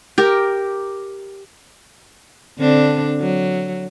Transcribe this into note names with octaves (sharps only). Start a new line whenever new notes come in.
G4 A#4
D3 C4 D4
F#3